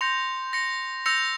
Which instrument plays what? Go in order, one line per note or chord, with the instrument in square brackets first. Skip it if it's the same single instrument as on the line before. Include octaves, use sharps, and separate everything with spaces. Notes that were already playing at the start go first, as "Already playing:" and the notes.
[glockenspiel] C6 [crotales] G6 A#6 C#7 F7
[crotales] G6 A#6 C#7 F7
[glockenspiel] E6 [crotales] G6 A#6 C#7 F7